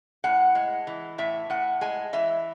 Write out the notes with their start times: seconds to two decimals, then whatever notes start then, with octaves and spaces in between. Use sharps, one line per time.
0.24 A2 F#5
0.55 G#3
0.87 E3
1.18 A2 E5
1.50 A2 F#5
1.81 G#3 G#5
2.13 E3 E5